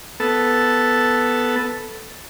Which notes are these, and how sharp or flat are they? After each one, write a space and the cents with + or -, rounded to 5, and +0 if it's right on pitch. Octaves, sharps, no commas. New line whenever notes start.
B3 +0 A4 +0